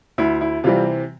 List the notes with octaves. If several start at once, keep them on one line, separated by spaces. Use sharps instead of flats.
D2 E4
E4
C3 E3 G3 C4 F4